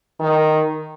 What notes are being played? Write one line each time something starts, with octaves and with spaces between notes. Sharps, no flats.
D#3